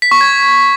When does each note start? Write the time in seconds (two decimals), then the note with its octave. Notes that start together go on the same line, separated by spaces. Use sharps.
0.02 B6
0.11 C#6
0.21 G#6